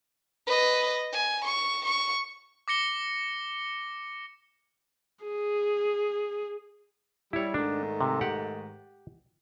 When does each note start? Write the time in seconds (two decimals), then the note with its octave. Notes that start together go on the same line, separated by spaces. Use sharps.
0.47 B4 D#5
1.13 G#5
1.45 C#6
1.85 C#6
2.68 D6 A#6 C#7 G7
5.24 G#4
7.33 G3 E4 C#5
7.54 G#2 D#3 A3 D4
8.01 C3
8.21 G4 F#5